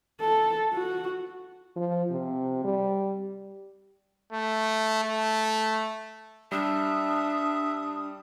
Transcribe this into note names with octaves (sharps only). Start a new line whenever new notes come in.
A4
F#4
F3
C3
G3
A3
A3
G3 D4 E5 D#6